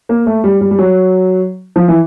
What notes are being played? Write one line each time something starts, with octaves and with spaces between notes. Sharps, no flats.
A#3
A3
G3
G3
G3
F#3
F3
E3